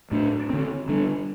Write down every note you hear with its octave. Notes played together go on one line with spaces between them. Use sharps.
A2 A3 D4
D3 C4
D3 G3 D4